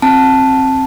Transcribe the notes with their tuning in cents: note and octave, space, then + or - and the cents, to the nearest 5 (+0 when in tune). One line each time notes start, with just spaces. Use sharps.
C4 +25 F#5 -15 A5 +0